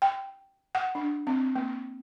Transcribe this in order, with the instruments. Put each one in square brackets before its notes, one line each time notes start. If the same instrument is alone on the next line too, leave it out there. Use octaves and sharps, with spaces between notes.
[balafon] G5
F#5
D4
C4
A#3